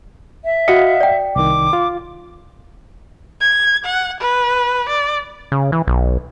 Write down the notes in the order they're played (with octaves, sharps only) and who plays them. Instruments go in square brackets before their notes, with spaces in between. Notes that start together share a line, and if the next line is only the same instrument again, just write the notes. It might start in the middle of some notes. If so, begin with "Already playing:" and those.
[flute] E5
[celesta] F#4 C#7 [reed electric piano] D#5 F5 F#5
[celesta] D5 G5
[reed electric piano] C2 D#3 [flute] D6
[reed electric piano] F4
[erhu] G#6
F#5
B4
D5
[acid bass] C#3
E3
B1